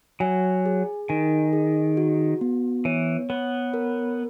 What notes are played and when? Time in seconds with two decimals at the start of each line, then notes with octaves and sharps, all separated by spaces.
0.20 F#3 G#5
0.66 G#4
1.09 D#3 G#5
1.53 G#4
1.97 F#4
2.41 B3
2.85 E3 C#5
3.30 B3 C#5
3.74 A#4